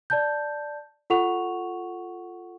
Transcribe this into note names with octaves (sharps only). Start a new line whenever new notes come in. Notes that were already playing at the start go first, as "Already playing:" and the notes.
D5 A5 G6
F4 A4 F#5 C#6 F7